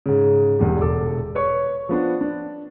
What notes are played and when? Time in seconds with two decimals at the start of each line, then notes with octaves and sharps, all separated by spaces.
0.06 G#2 C#3
0.59 E1 E2 G2 G#3 G4
0.81 E1 A4 D6
1.35 B4 C#5 C#6
1.89 F3 B3 D4
2.21 D4